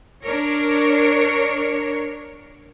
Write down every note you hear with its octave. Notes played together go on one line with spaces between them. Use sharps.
D4 A#4 C#5